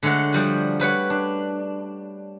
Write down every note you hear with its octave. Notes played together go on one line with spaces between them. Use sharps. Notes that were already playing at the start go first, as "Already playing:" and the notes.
D3 G#3 A3 C#5 F#5
F3 G3 F#4
G3 B4 C#5 F#5
D4